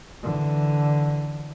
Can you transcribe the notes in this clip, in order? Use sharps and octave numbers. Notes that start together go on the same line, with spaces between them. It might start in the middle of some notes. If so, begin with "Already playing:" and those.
D3 E3